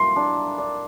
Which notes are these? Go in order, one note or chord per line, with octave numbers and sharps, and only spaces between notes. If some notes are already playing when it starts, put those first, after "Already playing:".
Already playing: A#3 E4 C6
D4
D4